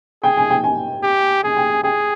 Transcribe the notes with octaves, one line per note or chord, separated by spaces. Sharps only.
G#4 G5
G#5
G5
G#5
G4
G#4 G#5
G5
G#5
G#4 G5